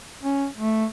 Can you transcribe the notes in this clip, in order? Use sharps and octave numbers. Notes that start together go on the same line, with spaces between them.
C#4
A3